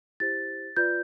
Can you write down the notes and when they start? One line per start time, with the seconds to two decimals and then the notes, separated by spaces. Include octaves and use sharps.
0.20 E4 G4 C5 A6
0.77 F4 B4 D5 G6